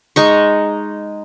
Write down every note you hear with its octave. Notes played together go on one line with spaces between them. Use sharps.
G#3 D#4 C#6